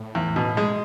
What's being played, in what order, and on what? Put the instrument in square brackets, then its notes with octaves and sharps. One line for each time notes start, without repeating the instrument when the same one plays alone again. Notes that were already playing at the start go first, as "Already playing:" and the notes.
Already playing: [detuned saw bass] A2
[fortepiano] E2
B2
G#3